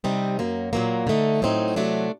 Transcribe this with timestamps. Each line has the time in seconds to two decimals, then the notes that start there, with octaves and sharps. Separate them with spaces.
0.04 C3 G3 C4 D#4
0.39 F#2 F#3 A#3
0.73 A#2 F#3 A#3
1.07 D3 A3 D#4
1.42 A2 F#3 C4 D#4
1.76 C3 F#3 A3 D4